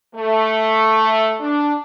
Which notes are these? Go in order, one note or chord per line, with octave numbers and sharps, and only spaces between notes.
A3
D4